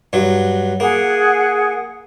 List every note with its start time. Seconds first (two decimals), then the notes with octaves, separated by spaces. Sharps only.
0.13 G2 F#3
0.80 A#3 G#4 F#5